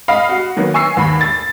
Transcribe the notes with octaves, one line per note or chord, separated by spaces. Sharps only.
D#5 F5 B5
F#4
D#3 F#3 A#3 B3
G#5 C#6 E6 C7
D#2 B5
A6